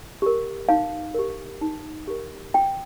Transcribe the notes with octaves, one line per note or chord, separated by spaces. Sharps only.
G4 A#4
D#4 F5
G4 A#4
D#4
G4 A#4
F4 G5